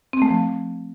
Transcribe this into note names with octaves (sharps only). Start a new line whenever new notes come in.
C4
A3
F3